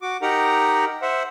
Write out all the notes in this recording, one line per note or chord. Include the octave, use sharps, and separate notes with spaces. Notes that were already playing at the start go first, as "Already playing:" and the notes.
F#4 D6
D#4 G4 A#4 F#5 A#5
C5 E5 F#5